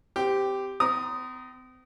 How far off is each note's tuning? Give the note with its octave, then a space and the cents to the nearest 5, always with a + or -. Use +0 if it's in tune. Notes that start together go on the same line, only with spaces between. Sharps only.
C4 -30 G4 +0
C4 -40 A#5 +10 D#6 +0